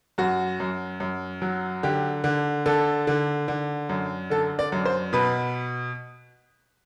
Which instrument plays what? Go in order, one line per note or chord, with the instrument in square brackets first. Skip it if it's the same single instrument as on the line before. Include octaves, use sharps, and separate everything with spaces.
[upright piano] F#2 F#4
F#2
F#2
F#3
D3 G4
D3
D3 A4
D3
D3
F#2
D3 A4
D5
F#2
C5
B2 B4